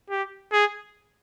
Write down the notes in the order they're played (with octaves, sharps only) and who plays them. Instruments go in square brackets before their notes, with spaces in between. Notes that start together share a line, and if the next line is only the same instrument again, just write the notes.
[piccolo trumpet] G4
G#4